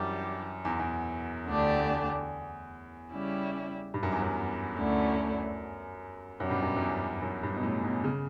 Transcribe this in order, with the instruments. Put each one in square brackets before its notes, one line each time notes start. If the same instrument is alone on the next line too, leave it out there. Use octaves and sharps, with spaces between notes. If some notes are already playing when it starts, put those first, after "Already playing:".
Already playing: [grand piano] F#2 [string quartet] E3 G3 D4 G4
[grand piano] E2
E2
[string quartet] D2 D3 A3 D4 G4
C#3 G3 C#4 E4 G4
[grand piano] G2
F#2
E2
F#2
[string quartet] D2 D3 A3 C#4 E4
[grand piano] F#2 [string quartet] B2 G3 C#4
[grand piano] G2
F#2
F#2
E2
F#2
G2
B2
A2
B2
C#3